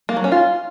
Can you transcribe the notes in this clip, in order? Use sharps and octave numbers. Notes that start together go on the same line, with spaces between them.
A#3
F#3
C#4
F4